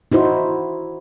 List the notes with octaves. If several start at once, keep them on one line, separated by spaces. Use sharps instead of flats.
D#4 E4 F#4 C5